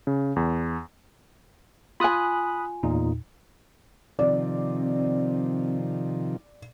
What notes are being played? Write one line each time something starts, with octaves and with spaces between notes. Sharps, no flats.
C#3
E2
F4 G#5 B5 D#6 F#6
E2 A#2 D#4
C3 D#3 F3 C4 D5